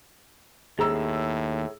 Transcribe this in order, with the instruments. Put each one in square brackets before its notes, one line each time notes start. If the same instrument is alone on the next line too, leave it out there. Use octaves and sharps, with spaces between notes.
[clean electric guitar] D#2 [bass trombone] A2 [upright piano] G#4 A#5 E6